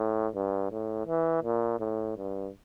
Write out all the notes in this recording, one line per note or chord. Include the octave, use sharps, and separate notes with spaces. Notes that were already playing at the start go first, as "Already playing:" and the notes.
Already playing: A2
G2
A2
E3
A#2
A2
G2